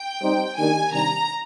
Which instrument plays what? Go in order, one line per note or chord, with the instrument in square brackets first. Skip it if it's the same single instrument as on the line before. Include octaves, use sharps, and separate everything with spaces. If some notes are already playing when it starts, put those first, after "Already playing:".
Already playing: [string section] G5
[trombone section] G3 C4 D#4 G4 C5
[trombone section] D#3 A#3 D4 G4 [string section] G#5
[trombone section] C3 D#3 G3 D4 [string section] A#5